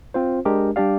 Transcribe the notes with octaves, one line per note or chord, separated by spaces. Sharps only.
C4 F4 C5
G#3 D4 G4 A#4
G3 D4 G4 D5 F5